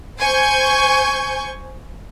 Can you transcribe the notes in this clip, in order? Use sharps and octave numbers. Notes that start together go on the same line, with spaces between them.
C5 G#5 C#6 G6